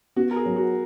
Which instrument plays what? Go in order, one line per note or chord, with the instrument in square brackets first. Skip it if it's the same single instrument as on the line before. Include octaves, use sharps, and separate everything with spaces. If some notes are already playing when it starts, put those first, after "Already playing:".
[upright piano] B3 [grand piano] F#4
[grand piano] A#4
G#4
[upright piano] F#3
[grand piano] F#4